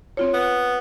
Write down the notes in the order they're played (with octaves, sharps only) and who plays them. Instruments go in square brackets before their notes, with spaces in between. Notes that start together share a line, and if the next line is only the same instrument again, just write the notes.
[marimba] C4 F4 C#5
[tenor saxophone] B3